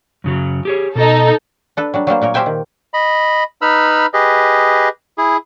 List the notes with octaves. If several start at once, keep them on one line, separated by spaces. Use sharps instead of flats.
F#2 C#3 F#3
G4 G#4 C#5
B2 D#4 A4
D4 A4 B4
F#3 G3 D4
F#3 G3 A#3 C5
A#2 A#3 A#4 C#5
G4 A#4 C5 E5 G5 G#5
D#3
D#5 B5
D#4 B4 B5 E6 F6
G4 G#4 B4 D#5
E4 G#4